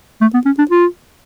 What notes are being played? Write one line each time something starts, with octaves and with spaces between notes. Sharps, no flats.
A3
B3
C#4
D4
F4